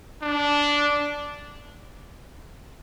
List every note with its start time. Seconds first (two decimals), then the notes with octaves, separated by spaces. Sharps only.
0.22 D4